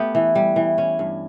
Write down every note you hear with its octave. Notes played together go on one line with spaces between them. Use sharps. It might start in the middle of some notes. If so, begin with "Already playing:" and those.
Already playing: A3 B3 G4
E3
G3
E3
C#4
G2